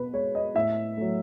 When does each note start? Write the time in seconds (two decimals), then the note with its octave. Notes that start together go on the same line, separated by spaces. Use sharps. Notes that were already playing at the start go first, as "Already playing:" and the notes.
Already playing: B2 B4
0.13 G#3 C#5
0.35 D#5
0.55 A2 E5
0.97 F#3 A3